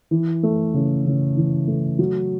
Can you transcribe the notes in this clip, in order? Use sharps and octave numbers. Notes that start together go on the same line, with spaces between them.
E3
A3
C#3
C#3
E3
A3
F#3